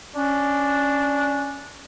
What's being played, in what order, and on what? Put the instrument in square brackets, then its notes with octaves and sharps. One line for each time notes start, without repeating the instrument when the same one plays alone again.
[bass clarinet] C#4 [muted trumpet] D4